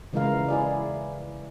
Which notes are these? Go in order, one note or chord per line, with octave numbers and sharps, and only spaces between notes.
C#3 E3 G#3 E4 A#4 F5
E4 G#4 D5